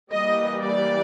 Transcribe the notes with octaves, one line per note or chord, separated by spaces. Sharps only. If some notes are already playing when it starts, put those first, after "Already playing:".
E3 G3 A#3 D#5
D5